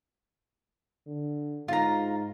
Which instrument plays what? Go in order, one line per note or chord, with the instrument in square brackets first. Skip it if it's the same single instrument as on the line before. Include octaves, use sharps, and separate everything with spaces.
[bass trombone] D3
[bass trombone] G#2 [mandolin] F4 A#5